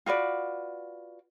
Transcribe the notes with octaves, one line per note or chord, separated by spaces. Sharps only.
F4 F#4 B4 D5